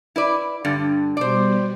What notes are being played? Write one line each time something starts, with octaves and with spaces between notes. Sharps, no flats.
E4 B4 D5
G2 D3
B2 G3 C5 D5